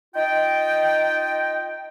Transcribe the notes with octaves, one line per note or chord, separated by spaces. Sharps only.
D#4 F4 D#5 G5